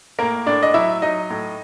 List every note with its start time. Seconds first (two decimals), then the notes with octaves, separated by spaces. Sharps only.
0.19 A2 A#3 A#4
0.46 A2 D4 D5
0.63 D#5
0.74 F#3 E4 E5
1.02 F#3 D#4 D#5
1.30 A2